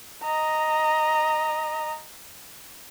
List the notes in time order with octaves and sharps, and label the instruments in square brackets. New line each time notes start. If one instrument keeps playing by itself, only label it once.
[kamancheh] D#5 A#5